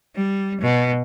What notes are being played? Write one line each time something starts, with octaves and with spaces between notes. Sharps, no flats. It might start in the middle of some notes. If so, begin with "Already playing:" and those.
G3
B2